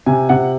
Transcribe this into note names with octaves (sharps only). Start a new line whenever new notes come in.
C3 G#5
C3 F#5